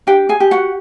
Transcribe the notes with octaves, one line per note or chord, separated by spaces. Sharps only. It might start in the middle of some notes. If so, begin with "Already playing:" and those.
D4 G4 G5
G#4 G#5
G4
F#4 F#5